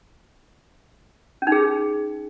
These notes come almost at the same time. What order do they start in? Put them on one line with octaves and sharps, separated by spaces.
C#4 D#4 G#4